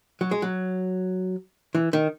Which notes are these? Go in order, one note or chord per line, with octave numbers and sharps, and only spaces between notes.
F#3
G#3
F#3
E3
D#3